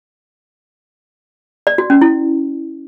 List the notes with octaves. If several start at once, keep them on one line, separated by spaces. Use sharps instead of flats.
D5
F#4
C#4
E4